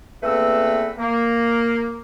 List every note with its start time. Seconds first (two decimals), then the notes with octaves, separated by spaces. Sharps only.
0.23 E2 A3 A#3 C4 B4 E6
0.99 A#3